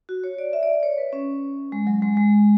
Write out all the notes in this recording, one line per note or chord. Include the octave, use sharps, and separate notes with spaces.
F#4
C#5
D5
E5
D5
D5
C#5
B4
C#4
G#3
F#3
G#3
G#3